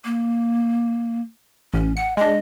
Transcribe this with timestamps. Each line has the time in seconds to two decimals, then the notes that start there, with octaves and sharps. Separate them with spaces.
0.05 A#3
1.74 A1 C#4
1.97 F#5 C#7
2.17 G#3 D4 D#5